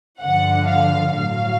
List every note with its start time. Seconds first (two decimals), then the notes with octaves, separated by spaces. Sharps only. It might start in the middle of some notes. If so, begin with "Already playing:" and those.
0.21 G2 D3 F3 F#5
0.68 F5
1.15 A2 F#3 F5